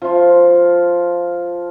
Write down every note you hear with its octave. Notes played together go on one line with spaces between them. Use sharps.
F3 F4